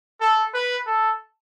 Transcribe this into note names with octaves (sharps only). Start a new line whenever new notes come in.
A4
B4
A4